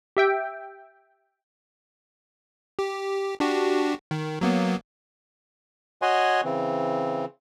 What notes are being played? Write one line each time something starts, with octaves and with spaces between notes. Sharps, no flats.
G4 E5 G5
G4
D4 F#4 G4
D#3
F#3 A#3 B3
F#4 C#5 D#5 F#5 G#5 C6
C#3 E3 C4